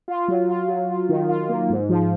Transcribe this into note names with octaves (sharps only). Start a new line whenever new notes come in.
F4
F#3
F4
F#3
F4
D#3
F4
A#3
G#2
F3